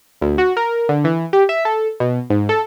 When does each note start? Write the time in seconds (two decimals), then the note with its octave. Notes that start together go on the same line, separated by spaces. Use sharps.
0.21 D2
0.38 F#4
0.57 A#4
0.89 D3
1.04 E3
1.33 G4
1.49 E5
1.65 A4
2.00 B2
2.30 G#2
2.49 A4